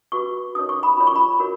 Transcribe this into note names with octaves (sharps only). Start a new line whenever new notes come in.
F#4 B4 C#6
D#4 A#4 C#5 D#6
C#6
B5
F4 A#4 C#5 B5
C#6
B5
F#4 A#4 C#5